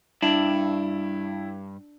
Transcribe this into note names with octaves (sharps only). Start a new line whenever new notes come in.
G2 D4 E4